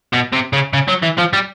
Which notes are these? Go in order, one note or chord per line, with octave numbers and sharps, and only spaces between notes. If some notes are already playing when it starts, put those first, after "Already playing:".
B2
C3
C#3
C#3
F#3
E3
F3
G3